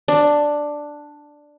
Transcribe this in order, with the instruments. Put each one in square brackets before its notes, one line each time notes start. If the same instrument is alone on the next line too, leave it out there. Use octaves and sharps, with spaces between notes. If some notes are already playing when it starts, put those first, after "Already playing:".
[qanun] D4